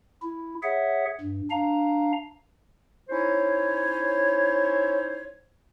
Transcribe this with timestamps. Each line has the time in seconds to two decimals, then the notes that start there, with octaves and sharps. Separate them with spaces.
0.22 E4
0.63 G#4 C#5 E5 F#5
1.21 G2
1.50 D4 F5 A#5
3.09 C#4 D#4 E4 C5 C#5